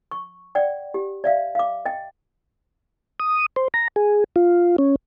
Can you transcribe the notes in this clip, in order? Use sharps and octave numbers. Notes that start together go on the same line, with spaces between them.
C#6
D5 F#5 G5
G4
D5 E5 F5
F5 D6
D#5 G5
D#6
C5
A#5
G#4
F4
C#4